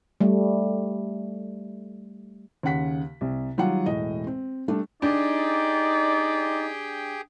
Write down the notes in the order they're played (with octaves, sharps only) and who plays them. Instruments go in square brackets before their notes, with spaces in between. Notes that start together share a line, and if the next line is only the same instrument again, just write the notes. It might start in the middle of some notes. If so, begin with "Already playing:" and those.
[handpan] G3 A3
[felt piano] D#2 C#3 F#5 B6
C2
D#3 F#3 G3 F4 F#5
E1 A2 D#5
C4
G3 A3 D4
[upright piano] D4 [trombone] D#4 [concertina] G4 G#4 G5 [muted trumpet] D5